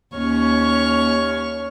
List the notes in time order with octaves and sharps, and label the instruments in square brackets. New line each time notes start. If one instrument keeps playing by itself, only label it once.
[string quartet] D#2 C#4 C#5 C#6 F6